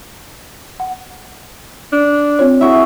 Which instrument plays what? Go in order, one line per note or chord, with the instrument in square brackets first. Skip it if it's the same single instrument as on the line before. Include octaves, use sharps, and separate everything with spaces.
[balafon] F#5
[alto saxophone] D4
[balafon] C4 F4 C#5
[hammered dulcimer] E4 F#4 G#4 [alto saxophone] E5